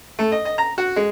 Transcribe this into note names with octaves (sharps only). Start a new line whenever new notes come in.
A3
D#5
D#5
A#5
F#4
G#3